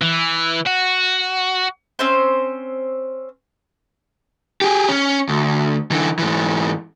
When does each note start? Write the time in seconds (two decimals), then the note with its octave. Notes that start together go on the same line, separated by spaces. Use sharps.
0.02 E3
0.67 F#4
1.99 C4 C#4 C5
4.61 G4 G#4
4.89 C#4
5.29 D2
5.91 D3 E3
6.19 G#2 E3